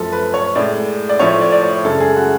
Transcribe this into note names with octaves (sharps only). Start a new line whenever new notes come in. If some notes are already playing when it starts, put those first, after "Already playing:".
Already playing: F#2 F3 A3 A4
B4
C#5
A2 G#3 D5
D5
A2 F3 A3 C#5
D5
D5
C#5
F#2 C#3 G#3 A4
G#4
F#4